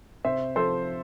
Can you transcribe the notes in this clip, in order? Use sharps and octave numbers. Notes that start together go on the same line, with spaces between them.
C3 C5 E5
F3 A4 C5